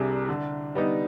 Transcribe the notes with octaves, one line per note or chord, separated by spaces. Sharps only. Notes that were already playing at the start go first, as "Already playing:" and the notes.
Already playing: C2 C3 G3 D4 G#4
D3
G3 B3 D#4